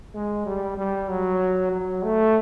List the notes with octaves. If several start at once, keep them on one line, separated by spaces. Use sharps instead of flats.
G#3
G3
G3
F#3
F#3
A3